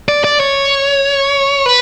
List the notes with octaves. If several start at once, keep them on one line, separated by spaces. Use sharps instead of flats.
D5
D5
C#5
B4